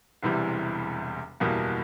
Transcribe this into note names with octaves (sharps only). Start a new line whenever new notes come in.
E1 E2 C3 E3 G3
F#1 E2 B2 G3 A#3